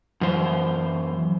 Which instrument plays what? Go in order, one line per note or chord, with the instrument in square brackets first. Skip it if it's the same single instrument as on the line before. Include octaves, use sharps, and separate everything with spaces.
[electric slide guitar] F#2 E3 C5